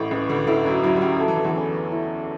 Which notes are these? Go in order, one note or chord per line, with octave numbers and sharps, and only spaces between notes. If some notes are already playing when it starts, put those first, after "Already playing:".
Already playing: A1 A2 E4
C#2 C#3 B4
D2 D3
D2 D3 E4
F#2 F#3
F#2 F#3 E4
G3
F#2 F#3
F#3 A3
E3
D3
E2 E3
C#4
E4